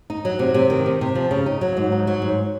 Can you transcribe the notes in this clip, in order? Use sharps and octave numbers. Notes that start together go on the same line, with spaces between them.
D#4
F#3
C3
C3
D#3
C3
C3
F3
C#3
D#4
F#3
G#2
D#4
F#3
G#2